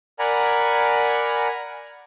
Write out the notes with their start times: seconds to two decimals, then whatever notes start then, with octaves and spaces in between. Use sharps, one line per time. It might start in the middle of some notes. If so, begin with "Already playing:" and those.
0.19 A#4 D5 F#5 G#5 A#5 B5